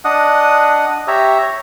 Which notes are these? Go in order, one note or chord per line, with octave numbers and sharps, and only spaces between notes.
D4 D#5 F#5 D#6
G4 C#5 E5 A#5
C#5